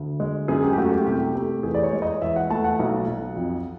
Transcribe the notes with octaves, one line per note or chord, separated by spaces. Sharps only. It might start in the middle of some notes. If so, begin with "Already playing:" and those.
Already playing: D2
G#3
F#2 G#4
G4
G4
A3 F#4
G4
C2 G4
A3
E2 G#4
D5
C#5
G#3
D#5
E2 E5
F#5
A3 A5
F#5
B1
B1
F2